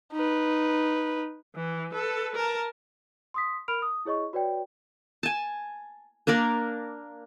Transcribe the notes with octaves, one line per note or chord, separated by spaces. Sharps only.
D#4 B4
E3
A4 B4
A#4 A5
C6 D#6 B6
A#4 B5 F6 D7 F7
D#6
E4 G#4 C#5 D#5 C#6
F#4 B4 C#5 D5 G5
G#5 A5
A#3 D4 A#4 D5